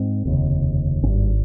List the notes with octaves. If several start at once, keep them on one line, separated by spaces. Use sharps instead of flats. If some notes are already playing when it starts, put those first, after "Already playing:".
Already playing: G#2 C4
F1 D#2 C#3
G#1 G2 C#4